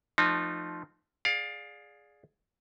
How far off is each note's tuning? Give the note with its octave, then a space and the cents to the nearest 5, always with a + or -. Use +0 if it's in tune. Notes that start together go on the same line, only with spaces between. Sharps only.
F3 +0 A3 +0 D#4 -30
G#4 +0 D5 +0 F5 +25